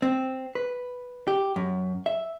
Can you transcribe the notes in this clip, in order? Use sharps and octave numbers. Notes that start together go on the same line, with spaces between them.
C4
B4
G4
F#2
E5